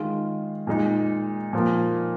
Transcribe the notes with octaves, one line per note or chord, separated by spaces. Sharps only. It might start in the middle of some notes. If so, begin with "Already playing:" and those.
Already playing: D#3 G#3 F4
A#2 G#3 D#4
A#2 F3 A#3